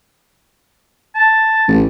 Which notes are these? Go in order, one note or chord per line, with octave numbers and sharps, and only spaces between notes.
A5
A1